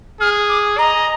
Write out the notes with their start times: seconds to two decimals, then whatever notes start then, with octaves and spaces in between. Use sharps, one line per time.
0.20 G#4 F6
0.49 D6
0.78 D#5 A#5